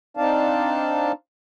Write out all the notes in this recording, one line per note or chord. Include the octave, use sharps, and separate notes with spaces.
C4 D4 D#4 D5 F5 A5